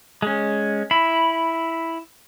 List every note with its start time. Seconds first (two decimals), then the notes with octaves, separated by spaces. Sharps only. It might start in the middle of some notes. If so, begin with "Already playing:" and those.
0.22 G#3 C#4
0.91 E4 B5